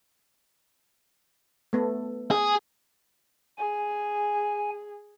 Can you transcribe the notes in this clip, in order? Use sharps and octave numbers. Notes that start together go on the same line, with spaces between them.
A3 B3 A4
G#4
G#4 G#5